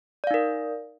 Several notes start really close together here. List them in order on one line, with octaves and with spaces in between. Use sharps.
D5 F5 D#4 A#4